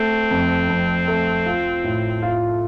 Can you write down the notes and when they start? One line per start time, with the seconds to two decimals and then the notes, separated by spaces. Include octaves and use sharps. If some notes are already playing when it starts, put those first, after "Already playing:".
Already playing: A3 C4
0.31 F2
0.69 F2
1.08 A3
1.46 F4
1.84 A2
2.22 A3 F4